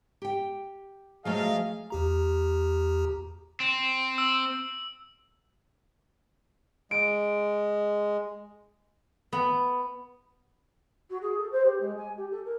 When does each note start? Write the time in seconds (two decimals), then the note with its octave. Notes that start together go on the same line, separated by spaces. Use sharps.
0.22 G4 G5
1.25 F3 F#3 A3 G#4 D#5 F5
1.90 E2 G4 A#5
3.60 C4
4.18 E6
6.91 G#3 D7
9.33 B3
11.10 F#4
11.21 G#4
11.38 A4
11.52 C5
11.65 G4
11.80 G#3
11.97 G#5
12.17 G4
12.31 A4
12.45 A#4